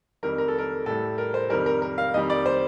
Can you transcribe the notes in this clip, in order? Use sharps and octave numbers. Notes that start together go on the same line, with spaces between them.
F2 D#3 G3 A#4
A#4
A4
A#4
A2 G3 A4
A#4
C5
F2 D#3 G3 A#4
A#4
A#4
F5
F2 D#3 G3 D#5
D5
C5